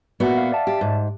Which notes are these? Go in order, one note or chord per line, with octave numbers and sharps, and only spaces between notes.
A#2 B3 F#4 D5 E5 F#5
F5
D5 E5 A5
G4
G#2